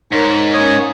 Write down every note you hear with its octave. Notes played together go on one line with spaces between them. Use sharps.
G#2 D#4 A#4 C#5
A#3 C#4 C#5 D#6